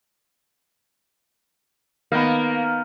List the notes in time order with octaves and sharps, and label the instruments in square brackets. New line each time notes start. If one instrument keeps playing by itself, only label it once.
[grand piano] D#3 B3 [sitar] A#3